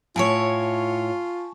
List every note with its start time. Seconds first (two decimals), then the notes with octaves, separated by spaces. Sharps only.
0.16 A2 E4 F4 C#5 G#5 A5 C#6